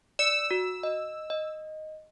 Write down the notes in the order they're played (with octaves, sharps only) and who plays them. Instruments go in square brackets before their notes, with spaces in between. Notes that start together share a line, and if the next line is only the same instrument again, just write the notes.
[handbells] D5 C#7 [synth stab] E6
[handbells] F#4
D#5
D#5